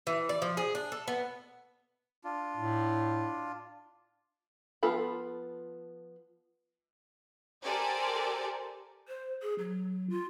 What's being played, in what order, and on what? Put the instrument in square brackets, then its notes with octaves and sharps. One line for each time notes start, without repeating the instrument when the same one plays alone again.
[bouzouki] E3
D5
F3
G#4
D4
A4
B3
[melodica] D4 F4
[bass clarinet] A2
[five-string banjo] F3 B3 F4 A4 B5
[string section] G4 A4 A#4 C5 D5 G#5
[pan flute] C5
G#4
F#3
F4